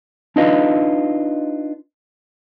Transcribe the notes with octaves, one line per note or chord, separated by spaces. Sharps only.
D4 D#4 F4 B4 D#5